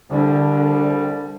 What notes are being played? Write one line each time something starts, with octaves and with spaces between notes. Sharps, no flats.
C2 D3 G3